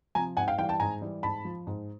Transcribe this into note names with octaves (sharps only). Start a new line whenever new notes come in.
C3 F3 G#5 A#5
G#2 F#5 G#5
F5 G5
E3 G3 F5 G5
G5 A5
G#2 G#5 A#5
E3 G3
G#2 A5 B5
F3
G#2